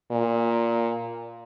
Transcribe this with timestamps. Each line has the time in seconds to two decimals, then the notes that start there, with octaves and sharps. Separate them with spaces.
0.11 A#2